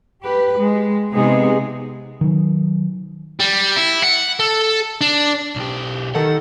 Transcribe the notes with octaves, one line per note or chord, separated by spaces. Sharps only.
G4 B4
G#3
C3 G#3 B3 D#4 G#4
D#3 F#3
G3
E4
F#5
A4
D4
B1 G4
D#3 A4 F#5